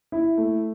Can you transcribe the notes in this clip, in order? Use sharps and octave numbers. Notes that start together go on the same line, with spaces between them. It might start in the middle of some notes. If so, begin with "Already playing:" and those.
E4
A3